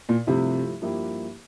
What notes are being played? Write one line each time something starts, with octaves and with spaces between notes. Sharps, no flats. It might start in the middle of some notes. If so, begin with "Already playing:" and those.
A#2
G2 C3 F3 A3 E4
G2 F3 A#3 E4 G4